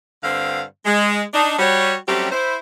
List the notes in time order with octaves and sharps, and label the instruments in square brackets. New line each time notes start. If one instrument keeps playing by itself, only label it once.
[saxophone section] G2 D3 C4 F5
G#3
D4 D#4
G3 F#4 C#5
F#3 G3 A3 C4 C#4 G4
E4 C5